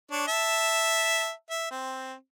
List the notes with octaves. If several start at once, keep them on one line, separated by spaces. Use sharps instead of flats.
D4 C#5
E5 A5
E5
C4